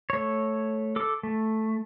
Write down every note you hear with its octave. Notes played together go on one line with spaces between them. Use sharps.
A3 C#5
A4 D6
A3